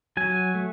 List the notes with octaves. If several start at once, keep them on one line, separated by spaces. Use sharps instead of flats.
F#3 G#5
A3